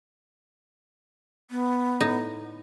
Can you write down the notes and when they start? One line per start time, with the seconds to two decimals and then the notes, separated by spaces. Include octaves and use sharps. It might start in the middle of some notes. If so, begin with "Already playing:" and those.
1.51 B3
2.01 A2 D#4